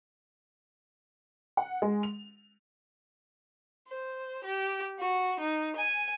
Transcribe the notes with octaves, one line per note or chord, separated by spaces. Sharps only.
F#5
G#3
F7
C5
G4
F#4
D#4
G#5